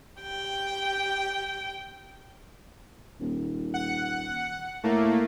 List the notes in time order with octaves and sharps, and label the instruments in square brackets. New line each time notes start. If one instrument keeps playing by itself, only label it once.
[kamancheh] G4 [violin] G5
[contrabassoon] D#1
[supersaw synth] F#5
[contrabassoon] A2 [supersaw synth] A3 A#3